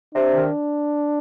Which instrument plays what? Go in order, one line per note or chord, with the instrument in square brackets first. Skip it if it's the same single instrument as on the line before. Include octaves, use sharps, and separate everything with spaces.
[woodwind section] C3 [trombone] D4
[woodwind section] D#3